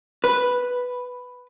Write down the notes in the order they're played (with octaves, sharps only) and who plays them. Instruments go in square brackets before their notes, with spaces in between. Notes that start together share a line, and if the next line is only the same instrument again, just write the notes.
[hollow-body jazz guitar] B4